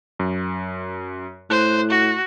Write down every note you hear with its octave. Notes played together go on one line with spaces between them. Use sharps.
F#2
A2 C5 F#6
F#4